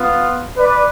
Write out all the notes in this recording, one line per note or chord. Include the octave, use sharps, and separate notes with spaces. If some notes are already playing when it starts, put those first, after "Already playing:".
Already playing: B3 F4
B4 D5